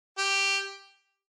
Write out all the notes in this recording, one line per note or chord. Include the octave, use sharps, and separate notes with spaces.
G4